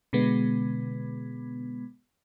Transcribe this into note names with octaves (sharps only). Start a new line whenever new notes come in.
B2 D3 G#3 B3